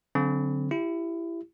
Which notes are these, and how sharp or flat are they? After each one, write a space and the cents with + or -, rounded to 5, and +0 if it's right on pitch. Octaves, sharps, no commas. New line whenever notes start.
D3 -20 F#3 -10 C4 +0
E4 +20 G4 +0